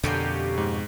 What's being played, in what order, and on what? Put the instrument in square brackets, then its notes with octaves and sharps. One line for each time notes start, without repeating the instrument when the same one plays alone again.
[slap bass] F2 B2 [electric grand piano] D3 [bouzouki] A#3 C#4 G4
[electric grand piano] G#2